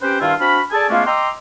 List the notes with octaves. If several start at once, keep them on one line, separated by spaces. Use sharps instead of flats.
C4 C#4 G4 B4 C5 G5
G2 D#3 D4 E4 F4
C4 D4 F#4 F5 B5
G#4 A4 D5 G#5 A5
G#3 A3 B3 C#4 D4 F4
D#5 G5 A#5 C6 D6 E6